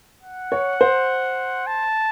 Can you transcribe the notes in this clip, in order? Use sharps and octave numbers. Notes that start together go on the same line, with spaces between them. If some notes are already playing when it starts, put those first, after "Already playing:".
F#5
C#5
C5
A5